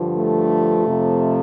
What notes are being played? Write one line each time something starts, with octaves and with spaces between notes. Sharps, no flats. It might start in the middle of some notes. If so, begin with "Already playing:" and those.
Already playing: G2 D3 F3
A3
F2 C3 F3